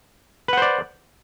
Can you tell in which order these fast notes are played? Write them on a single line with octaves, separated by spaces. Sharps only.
B4 F#5 C5 D5